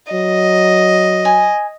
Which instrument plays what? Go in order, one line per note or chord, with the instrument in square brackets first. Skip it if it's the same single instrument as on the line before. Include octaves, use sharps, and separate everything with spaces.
[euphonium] F#3 [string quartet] D#5
[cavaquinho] G#5